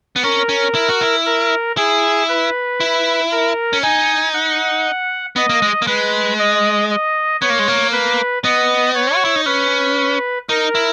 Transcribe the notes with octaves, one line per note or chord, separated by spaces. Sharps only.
B3
C#4 A#4
C#4
E4
F#4
E4
A#4
E4 G#4
B4
E4
A#4
C#4
D#4 G#5
F#5
B3 D#5
A#3
G#3
A#3
G#3 B4
D#5
D#5
B3 C#5
A#3
G#3
A#3
B4
B3 D#5
C#5
F#4
E4
D#4
C#4 B4
D#4 A#4
E4